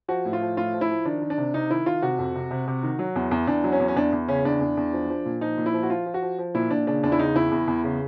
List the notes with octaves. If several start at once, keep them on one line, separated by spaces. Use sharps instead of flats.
F3 F#4
A2
F4
F3
A2 F4
F3
E4
F3
D#3 D4
D#3
D4
C3
C3 D#4
D#3 E4
D#3 F4
C3 F#4
F2
C3
C3
C3
D#3
F#3
E2
E2
E2 D4
F#3
C#4
E2
C#4
E2 D4
E2
C#3 C#4
E2 D4
E2
E2
F3
F3
A#2
F3 D#4
A#2
E4
F3
F#4
F3 F4
F3
F#4
F3
F3
A#2 E4
A#2 D4
C#3 D4
E2 D4
E4
C#3 D#4
E2 E4
E2
E2
C#3